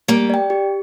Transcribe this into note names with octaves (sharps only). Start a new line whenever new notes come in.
G3 A#3 G4
D5 G5
G4